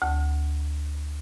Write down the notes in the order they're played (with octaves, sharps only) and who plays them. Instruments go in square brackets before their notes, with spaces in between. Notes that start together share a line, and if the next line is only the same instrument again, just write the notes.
[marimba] D2